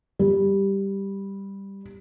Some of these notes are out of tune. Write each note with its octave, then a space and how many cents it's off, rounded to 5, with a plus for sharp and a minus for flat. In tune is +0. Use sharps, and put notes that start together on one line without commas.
G3 +5